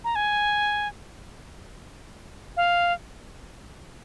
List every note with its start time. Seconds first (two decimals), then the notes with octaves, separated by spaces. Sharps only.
0.04 A#5
0.15 G#5
2.57 F5